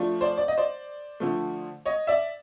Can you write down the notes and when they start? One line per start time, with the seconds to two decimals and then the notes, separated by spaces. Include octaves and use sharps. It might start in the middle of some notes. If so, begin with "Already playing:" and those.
Already playing: F3 A3 D4 F4
0.21 C5 D5
0.38 D5
0.48 D#5
0.57 C5 D5
1.20 D3 F3 A3
1.86 C#5 D#5
2.07 D5 E5